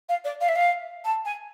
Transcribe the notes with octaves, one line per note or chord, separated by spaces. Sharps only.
F5
D5
F5
E5
F5
A5
G#5